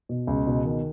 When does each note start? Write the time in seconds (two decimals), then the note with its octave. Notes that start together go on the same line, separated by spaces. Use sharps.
0.09 B2
0.27 C#2
0.47 B2
0.65 D#3